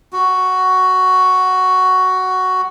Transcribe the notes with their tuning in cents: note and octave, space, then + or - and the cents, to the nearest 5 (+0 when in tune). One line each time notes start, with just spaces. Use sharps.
F#4 +5